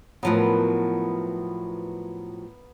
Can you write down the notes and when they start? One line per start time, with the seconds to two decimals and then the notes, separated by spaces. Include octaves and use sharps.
0.23 A2 F3 F#3 B3 A#4 B4